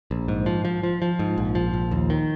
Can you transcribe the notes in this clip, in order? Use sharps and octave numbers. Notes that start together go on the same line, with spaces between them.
A#1
G#2
F3
F3
F3
F3
G#2
A#1
F3
A#1
D#2
D#3